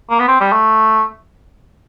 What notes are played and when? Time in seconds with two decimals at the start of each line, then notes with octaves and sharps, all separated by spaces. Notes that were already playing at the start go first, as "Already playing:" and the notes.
0.11 A#3
0.20 B3
0.28 C4
0.41 G3
0.53 A3